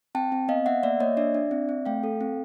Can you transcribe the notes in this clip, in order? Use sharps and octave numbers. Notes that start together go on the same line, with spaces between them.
C4 G5 A5
C4
B3 D#5 F5
B3 E5 F#5
A#3 D5 E5
A#3 C#5 D#5
D4 D5 E5
D4
C4
C4
A3 F5 G5
A4
C4